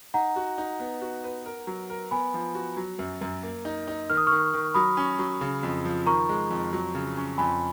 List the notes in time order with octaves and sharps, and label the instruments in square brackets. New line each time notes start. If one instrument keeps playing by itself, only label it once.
[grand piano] D#4 [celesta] F#5 A#5
[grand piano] F#4
D#4
B3
F#4
B4
A#4
F#3
A#4
[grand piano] B3 [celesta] G#5 B5
[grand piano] F3
F#4
F#3
F#2
F#2
A#3
D#4
D#4
[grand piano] D#3 [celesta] F6
[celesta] D#6
[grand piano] D#3 [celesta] C#6 F6
[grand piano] D#3
[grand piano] F#3 [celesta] B5 D#6
[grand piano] C#4
F#3
C#3
F2
F3
[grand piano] D#3 [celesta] A#5 C#6
[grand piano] G#3
F2
F#3
C#3
C#4
[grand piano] F2 [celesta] G#5 B5